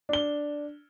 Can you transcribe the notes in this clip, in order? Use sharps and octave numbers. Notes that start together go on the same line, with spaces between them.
D4 G7